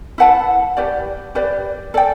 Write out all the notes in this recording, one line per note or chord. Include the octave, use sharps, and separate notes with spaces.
E4 B4 F#5 A5
G4 B4 D5
G4 B4 D5
A4 D5 G5